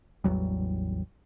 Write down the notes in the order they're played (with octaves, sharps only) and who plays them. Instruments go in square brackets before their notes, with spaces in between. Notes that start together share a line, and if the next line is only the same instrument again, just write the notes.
[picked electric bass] A1 E2 F#3 G3